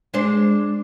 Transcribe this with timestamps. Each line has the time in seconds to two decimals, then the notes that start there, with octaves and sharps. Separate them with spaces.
0.14 G#3 D4 C5